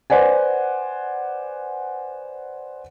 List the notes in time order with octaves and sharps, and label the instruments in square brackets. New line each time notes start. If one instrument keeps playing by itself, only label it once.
[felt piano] B4 C5 D5 F#5 G#5